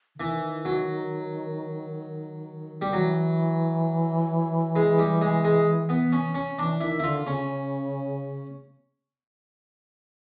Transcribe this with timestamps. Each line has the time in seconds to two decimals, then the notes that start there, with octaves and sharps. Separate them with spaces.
0.15 D3
0.19 D#3 E3
0.65 F#3
2.82 G3
2.93 E3 F#3
4.76 G#3
4.98 G3
5.21 G#3
5.44 G#3
5.89 B3
6.12 C#4
6.35 C#4
6.59 E3 D4
6.81 D#3 E4
6.99 E4
7.03 D3 F4
7.26 C#3 C#4